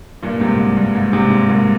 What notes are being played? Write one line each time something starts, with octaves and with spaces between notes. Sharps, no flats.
G2 A#2
G#2 C3
G2
G2
G#2
G#2 C3
G#2
G2 A#2